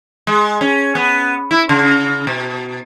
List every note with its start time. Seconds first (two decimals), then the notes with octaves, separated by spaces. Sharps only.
0.27 G#3
0.61 C#4
0.95 B3
1.51 E4
1.69 C#3
2.27 B2